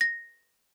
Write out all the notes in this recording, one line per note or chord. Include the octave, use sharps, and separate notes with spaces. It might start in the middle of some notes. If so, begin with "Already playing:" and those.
A#6